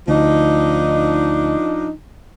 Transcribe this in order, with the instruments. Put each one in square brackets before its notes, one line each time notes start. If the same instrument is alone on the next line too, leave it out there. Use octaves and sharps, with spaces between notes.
[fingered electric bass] D2 [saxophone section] F3 D4 D#4